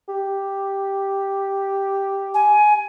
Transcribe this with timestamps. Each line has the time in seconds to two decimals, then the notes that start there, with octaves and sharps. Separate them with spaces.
0.09 G4
2.34 G#5